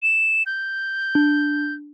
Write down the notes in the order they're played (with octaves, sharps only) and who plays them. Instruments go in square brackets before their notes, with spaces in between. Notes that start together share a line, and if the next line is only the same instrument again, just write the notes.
[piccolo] E7
G6
[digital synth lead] D4